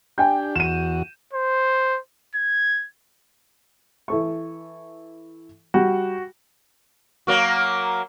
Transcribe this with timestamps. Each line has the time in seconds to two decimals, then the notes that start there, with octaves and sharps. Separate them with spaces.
0.18 D4 G4 G5 G#5 G6
0.55 E2 F#4 D#7 E7
1.33 C5
2.35 G#6
4.08 E3 A4 C#6
5.74 G3 F#4
7.27 F#3 A#3 F#4